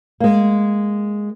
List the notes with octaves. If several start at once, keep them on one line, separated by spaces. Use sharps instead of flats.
G#3 A#3